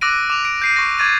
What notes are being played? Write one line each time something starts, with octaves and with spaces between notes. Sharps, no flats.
D6 E6 F#6 A#6 D7 D#7
D6 F7
D7
G6 C7 D#7
C#6 A#6
D6 G#6 A6 D#7